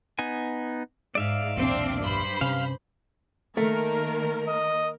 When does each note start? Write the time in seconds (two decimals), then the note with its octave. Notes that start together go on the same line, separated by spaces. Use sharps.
0.19 B3 D#4 G#5
1.15 G#2 D5 E5 F5
1.57 B1 E2 A#2 C4 D4
2.02 G2 C5 B5
2.41 C3 C#4 F5
3.57 D#3 A3 A#3 A#4
4.48 D#5